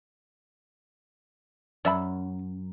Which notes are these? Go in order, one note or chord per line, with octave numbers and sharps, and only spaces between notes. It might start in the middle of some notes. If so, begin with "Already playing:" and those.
F#2 D5 E5 B5